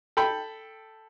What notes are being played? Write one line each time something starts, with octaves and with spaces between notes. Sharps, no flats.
A4 G5 B5